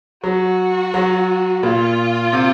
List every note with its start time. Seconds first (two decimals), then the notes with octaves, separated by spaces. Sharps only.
0.24 F#3 F#4
0.94 F#3
1.63 A#2 F4
2.33 C3